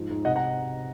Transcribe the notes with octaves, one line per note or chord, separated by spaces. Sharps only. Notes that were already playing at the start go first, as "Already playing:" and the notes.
Already playing: G#2 F3
G#2
C3 D#5 F#5
F#5 A#5